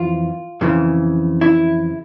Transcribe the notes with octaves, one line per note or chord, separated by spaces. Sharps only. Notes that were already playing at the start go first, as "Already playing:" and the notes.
Already playing: F2 E3 F4
F2 C#3 E3
E4